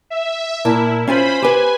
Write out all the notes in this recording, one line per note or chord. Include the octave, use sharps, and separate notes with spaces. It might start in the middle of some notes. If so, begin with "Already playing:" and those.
E5
A#2 E4 A#4 A5
C#4 F4 C5 G#5 B5
G4 B4 G#5